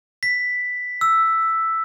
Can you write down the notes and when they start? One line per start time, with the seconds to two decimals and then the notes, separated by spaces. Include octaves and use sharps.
0.23 B6
1.01 E6